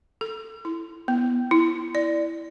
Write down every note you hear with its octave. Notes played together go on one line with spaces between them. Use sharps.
A4
E4
B3
E4
D5